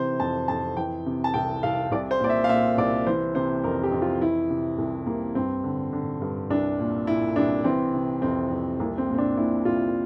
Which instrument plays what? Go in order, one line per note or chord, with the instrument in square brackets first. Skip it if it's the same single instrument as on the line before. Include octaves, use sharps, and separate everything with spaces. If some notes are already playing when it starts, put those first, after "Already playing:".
Already playing: [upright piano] C3 E3 C5
F2 A5
F2 A5
E3 G5
C3
A5
C2 G5
C2 F5
C2 D5
C5
A#2 D5
E5
F5
A#2 E5
C2 D5
E3 C5
C3 C5
F2 A#4
G4
F2
F4
E3 E4
C3
C2
C2 A#3
G2 C4
D3
D3
G2
C2 D4
A#2
A#2 E4
C2 D4
E3 C4
C3
F2 C4
F2
C2 A#3
C4
A#2
C4
D4
A#2 E4
C2 F4